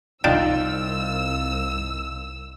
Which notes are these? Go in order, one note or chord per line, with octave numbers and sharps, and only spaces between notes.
C2 D4 D#4 F4 G5 A5 E6